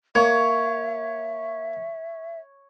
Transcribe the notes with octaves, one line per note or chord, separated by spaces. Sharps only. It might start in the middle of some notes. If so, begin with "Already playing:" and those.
A#3 C#5 E5